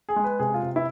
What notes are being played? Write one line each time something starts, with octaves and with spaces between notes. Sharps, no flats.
G#4
G#3
B4
C3 G#4
F4
C3
E4